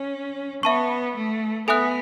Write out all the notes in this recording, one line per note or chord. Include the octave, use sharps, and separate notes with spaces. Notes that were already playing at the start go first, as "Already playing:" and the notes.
Already playing: C#4
B3 E5 A5 C#6
A3
B3 A4 E5 G#5 D#6 F#6